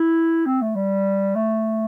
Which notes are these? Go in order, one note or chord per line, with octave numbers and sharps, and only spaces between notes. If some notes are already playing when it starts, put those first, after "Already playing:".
Already playing: E4
C4
A3
G3
A3